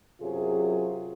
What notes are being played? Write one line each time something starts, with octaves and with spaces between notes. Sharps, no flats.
F#2 C3 F#3 F4 G#4